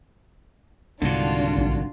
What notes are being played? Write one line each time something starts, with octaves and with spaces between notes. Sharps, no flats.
C2 G#2 D3 D#3 D4 F4 F#4
A#1